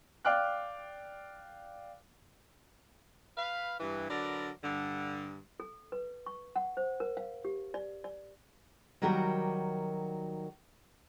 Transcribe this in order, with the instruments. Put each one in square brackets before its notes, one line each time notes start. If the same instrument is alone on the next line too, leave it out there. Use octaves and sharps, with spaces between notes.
[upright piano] D5 F5 G5 D6 F6 F#6
[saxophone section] B4 F5
G2 E3
D3 F#3 A#4 B4 D5
G2 D3
[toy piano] A4
B4
C#6
F#5
C5
A#4
F5
G4
D5
D5
[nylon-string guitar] D#3 F#3 G3 F#4 G4 A#4